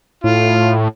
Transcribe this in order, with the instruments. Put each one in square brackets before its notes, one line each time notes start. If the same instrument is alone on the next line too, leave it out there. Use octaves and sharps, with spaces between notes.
[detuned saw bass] A2 [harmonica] F4